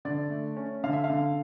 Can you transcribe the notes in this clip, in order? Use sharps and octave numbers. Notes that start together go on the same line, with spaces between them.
D3 D5
A3
C#4
D3 F5
E5
F5
D3